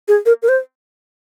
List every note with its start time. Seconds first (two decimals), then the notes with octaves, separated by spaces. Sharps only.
0.08 G#4
0.26 A#4
0.43 A#4
0.49 C5